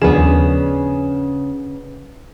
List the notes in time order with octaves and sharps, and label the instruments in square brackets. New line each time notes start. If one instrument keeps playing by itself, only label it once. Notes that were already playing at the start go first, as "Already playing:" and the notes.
[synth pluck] D#2 F3 E7 [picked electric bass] C#3 [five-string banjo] B3 D4 G#4